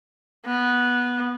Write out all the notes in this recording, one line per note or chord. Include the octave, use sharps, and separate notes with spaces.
B3